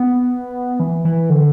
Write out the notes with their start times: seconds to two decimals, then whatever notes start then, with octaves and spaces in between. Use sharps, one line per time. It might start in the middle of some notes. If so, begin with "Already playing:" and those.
Already playing: B3
0.80 E3
1.05 E3
1.30 D3